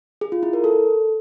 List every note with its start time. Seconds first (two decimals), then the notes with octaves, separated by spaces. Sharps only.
0.21 G#4
0.32 F4
0.43 E4
0.53 A#4
0.64 A4